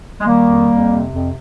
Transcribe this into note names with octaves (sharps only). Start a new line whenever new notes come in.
G#3
D#3 G3 A#3
F2
F2
C3
F2